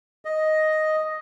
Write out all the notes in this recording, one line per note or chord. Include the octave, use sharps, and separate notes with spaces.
D#5